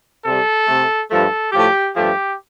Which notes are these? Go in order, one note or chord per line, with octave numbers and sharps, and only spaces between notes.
C3 A4
G3
C3 A3
G2 F3 A3 A4
A2 F3 A3 G4
G2 F3 A3 G4